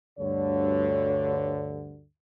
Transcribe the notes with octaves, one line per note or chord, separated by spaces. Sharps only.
D2 G2 D3 C#5